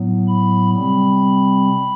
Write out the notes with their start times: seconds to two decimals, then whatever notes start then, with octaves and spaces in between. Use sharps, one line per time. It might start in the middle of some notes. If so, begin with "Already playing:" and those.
Already playing: A2 F#3 B3
0.28 B5
0.75 C3 G3 C4 B5